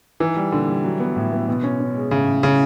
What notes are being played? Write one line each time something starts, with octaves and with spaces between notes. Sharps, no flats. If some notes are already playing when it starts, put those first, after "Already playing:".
E3 D#4
G3
A#2 D3
G3
F#3
B3
A2
B3
B2
C#4
C#4
G#3
A2 C#3
A2
C#3 C#4